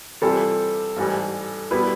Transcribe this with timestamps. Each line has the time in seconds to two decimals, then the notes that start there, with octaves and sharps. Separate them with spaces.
0.21 C3 E3 G3 C4 F4 A4
0.96 A1 G#2 E3 G3
1.71 B2 G3 B3 E4 B4